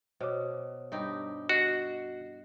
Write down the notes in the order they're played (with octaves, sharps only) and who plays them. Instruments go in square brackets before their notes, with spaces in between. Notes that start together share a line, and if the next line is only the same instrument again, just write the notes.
[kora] B2 [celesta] C5 C#5 D6
[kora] G2 D#4 G4
[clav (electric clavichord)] F#4 [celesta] D#5 C7